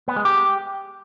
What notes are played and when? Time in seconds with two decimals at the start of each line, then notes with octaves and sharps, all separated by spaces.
0.08 B3
0.16 G#3
0.25 G4